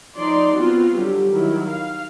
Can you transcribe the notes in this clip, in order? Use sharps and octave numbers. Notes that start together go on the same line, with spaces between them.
F3 D#4 D5 C6
B3 C4 F4 F#4
D3 F#3 G3 G4
D#3 F#3 E4
F5